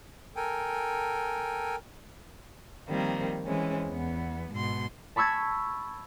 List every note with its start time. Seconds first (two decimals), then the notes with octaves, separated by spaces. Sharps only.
0.36 A4 A#4 G5 G#5
2.89 D#3 F3 G3 A#3 C4
3.45 E3 G#3 C4 C#4
3.87 E2 B3
4.53 G#2 B2 C6
5.16 A5 B5 C#6 E6 G#6 A6